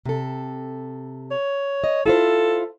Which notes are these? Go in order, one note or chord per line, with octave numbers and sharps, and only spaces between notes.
C3 A4
C#5
D#5
E4 F4 A4 C5